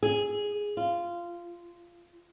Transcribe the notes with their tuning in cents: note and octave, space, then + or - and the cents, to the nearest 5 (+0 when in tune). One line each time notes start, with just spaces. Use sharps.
G#4 +0
F4 -15